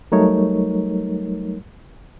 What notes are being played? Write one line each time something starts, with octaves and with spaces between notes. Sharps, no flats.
F#3 G3 A3 D#4 A#4 C#5